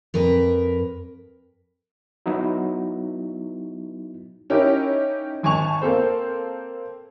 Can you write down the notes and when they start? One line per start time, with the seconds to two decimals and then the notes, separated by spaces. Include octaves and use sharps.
0.14 F2 A#4 B4
2.26 F#3 B3 D#4 E4
4.50 C#4 D#4 E4 G4 A#4 C#5
5.43 G#1 G#5 A5 C#6 F7
5.81 A#3 C4 A4 C5